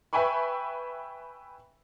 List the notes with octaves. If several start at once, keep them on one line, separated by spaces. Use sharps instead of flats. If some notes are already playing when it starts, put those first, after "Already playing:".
B4 E5 G5 G#5 B5 C#6